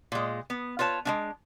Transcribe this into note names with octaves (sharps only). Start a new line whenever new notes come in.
A#2 G#3
B3
F4 B4 C#5 A5
G#3 A#3 D4